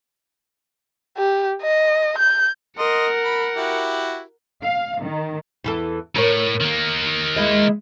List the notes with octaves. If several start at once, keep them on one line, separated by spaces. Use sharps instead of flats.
G4
D#5
G6
A#4 D#5 F#5 C6
B5
E4 F#4 G4
F5
D#3
E2 E3 A4
A2 A#4 C#5
D#3 A#3
G#3 E4 D#5